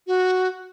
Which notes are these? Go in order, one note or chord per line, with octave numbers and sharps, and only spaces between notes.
F#4